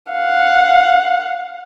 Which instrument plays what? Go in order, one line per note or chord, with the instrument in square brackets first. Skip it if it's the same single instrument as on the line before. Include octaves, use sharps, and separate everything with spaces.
[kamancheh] F5 F#5